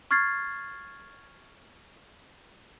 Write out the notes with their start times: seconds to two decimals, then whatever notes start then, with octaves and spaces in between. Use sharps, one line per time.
0.11 C#6 F6 G#6 A6 C7